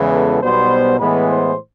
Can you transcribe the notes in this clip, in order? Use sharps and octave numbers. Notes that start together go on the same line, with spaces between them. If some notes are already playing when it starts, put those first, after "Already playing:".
Already playing: E2 C#3 E3 G#3 B3
A4
B1 B2 G3 B3 C5
A2 E3 G#3 B3 B4
C5